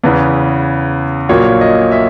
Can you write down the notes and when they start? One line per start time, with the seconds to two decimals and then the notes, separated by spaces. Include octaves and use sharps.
0.04 E2 C#3 E3 B4
1.29 A#1 A#2 F#3 A#3 C#5
1.61 D#5
1.92 E5